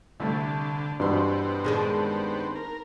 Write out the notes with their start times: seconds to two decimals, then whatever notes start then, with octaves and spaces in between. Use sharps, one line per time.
0.20 C2 D3 A3
1.00 G2 B2 E3 B3 C4 C6
1.65 D#3 G#3 D4
2.56 A#4